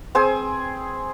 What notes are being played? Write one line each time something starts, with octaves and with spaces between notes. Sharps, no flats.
C4 G#4 C5 G#5